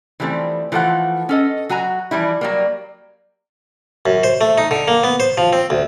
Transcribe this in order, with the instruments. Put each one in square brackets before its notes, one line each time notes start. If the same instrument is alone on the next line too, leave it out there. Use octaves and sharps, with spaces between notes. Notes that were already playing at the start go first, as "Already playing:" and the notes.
[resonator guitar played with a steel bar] E3 F3 G3 A3 C4
E3 F3 A3 F4 F#5
C#4 A4 D#5
F#3 F#4 G#5 A#5
E3 F3 G3 E4
F#3 G3 A#3
[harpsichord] F#2
C5
A3
D#4
D3
A#3
B3
C5
F3
C4
D2